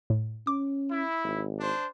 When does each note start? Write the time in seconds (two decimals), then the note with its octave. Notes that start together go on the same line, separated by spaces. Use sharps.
0.10 A2
0.47 C#4 D6
0.89 E4
1.24 G#1
1.59 D4 C5